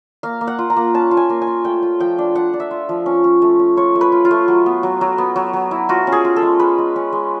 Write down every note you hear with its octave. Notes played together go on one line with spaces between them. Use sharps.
A#3 F5
A#3
F#5
F4
A#5
A#3
C#4 A5
F4
G#5
A#3
G#5
F4
A3 G5
F4
F3 G5
D4
D4 F#5
D4
E5
F4
F3
C#4
C#4
A3
C#4
F4 C#5
A3
B4
F4
F4
A3
F#3
B3
F#3
F#3
B3
F#3
F#3
E4
F4 F#4
C#4
G#4
F4
A4
G#3
G#3 B4
G#3
C#4
G#3